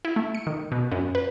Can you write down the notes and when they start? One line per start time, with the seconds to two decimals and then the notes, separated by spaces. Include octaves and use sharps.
0.05 E4
0.16 A3
0.35 C#7
0.47 D#3
0.72 B2
0.91 F#2
1.15 B4